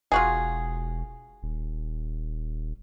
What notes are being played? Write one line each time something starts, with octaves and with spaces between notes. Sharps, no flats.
E1 F4 F#4 G#4
D#1